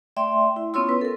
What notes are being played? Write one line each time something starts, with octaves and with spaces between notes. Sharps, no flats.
A3 D5 E5 G5 C6
E4
B3 C#4 F4 C#5 C6 E6
B4
A4 A#4